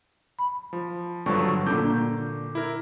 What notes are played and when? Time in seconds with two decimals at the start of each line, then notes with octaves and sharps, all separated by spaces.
0.39 B5
0.73 F3
1.26 G2 D3 F3 F#3 C#6
1.66 A#2 D3 D6 G6
2.55 E4 A#4